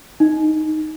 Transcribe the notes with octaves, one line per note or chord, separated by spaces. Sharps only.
D#4